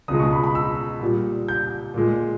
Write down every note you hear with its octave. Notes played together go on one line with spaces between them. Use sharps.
C#2 B2 G#3 D#6
C#6
B5
B5
E6
A#2 G3
G6
A#2 G#3